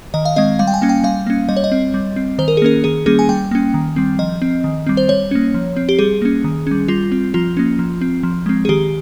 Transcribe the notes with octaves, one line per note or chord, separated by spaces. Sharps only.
D#3 D#5
F5
G#3 C4 D#5
G3 F5
G5
G#5
A#3 C#4
G5
G3 F5
A#3 C#4
G3 D#5
C#5
D#5
C4
G3
C4
D#3 C5
A#4
G#4
A#3 C#4 A#4
D#3 G#4
G3 A#3 C#4 G#4
G#5
G3 G5
A#3 C#4
D#3
G3 C4
F3 D#5
C4
D#3
G3 C4
C5
G3 C#5
A#3 C#4
F3
C4
G4
G3 G#4
A#3 C#4
D#3
G3 C#4
G3 F4
C4
F3 F4
A#3 C#4
F3
C4
F3
G#3 C4
G#4
D#3 G4